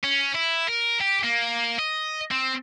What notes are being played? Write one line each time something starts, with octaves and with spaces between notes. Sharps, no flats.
C#4
E4
A#4
G4
A#3
D#5
C4